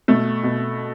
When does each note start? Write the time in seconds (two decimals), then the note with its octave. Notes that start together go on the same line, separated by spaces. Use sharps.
0.08 B2 A3
0.43 B2